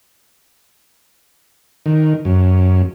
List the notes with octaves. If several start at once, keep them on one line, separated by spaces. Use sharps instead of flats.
D#3
F#2